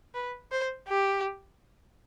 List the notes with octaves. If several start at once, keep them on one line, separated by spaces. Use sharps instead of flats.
B4
C5
G4